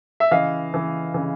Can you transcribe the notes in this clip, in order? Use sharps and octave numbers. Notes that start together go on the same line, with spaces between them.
E5
C#3 E3 D#5 F5
C#3 E3
C#3 E3